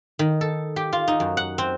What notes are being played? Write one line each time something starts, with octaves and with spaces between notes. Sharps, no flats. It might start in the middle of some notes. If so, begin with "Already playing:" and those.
D#3
A4
G4
F4
D#4
F#2
F#5
C4